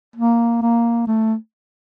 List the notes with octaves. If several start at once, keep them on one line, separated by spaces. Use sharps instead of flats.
A#3
A#3
A3